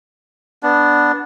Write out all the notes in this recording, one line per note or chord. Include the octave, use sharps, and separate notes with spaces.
B3 D4